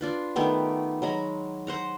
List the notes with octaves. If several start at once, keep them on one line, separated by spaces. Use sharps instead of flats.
D4 F4 B4
D#3 A3 B3 G4
F#3 G#3 A#5 B5
C5 F#5 A#5